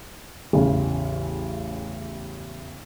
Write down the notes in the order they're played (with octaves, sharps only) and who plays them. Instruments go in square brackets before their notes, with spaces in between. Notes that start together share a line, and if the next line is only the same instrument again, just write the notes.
[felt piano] A1 E2 C#3